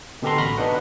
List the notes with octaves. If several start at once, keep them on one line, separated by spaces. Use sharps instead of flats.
B2 D3 G4 A4 A#5 C6
A1 F#4 B5 F6 A#6
B3 D4 D#4 B4 F#5